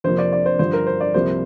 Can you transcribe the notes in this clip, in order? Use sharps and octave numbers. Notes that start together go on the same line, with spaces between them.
F2 C3 F3 A#3 C5
D5
D5
C5
G2 D3 F3 C5
A#4
C5
D5
C2 C3 F3 A#3 C5